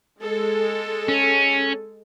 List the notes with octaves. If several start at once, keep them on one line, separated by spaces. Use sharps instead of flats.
G#3 A4
C#4